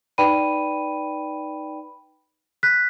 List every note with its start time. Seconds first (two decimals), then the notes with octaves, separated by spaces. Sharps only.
0.18 D#4 B4 D5 G5 B5 D#7
2.63 F#6 B6